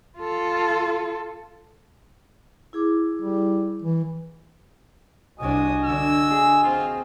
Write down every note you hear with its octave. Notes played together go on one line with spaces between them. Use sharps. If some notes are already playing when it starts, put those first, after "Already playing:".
F4 A4
E4 G#4 D6
G3
E3
C2 D4 F#4 D#5 G#5 D#6
D3 D4 E6
G#4
C4 F4